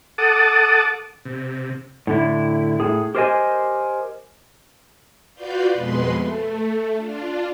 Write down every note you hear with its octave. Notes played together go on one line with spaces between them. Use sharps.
A4 F#5 A5 D6 D#6
C3
A2 D3 E4
A2 G#4
G4 A#4 C5 D5 D#5 G#5
F4 F#4 B4 D5 F5 G6
F2 B2 G#3 B4 C6
A3
D4 F4